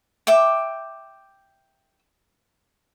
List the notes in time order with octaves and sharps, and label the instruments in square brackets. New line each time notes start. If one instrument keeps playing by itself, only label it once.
[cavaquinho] E5 G5 D6